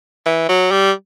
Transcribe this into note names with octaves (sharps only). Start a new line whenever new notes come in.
E3
F#3
G3